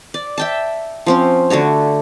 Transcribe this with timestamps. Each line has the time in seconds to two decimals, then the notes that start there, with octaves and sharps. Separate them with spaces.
0.14 D5
0.38 E5 G5 A5
1.06 F3 C4 C#4
1.50 D3 A3 F#4 C#5